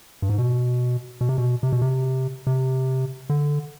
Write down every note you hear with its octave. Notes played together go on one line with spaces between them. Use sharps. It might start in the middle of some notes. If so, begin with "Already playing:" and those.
G2
G#2
B2
B2
C3
B2
C3
B2
C3
C3
D3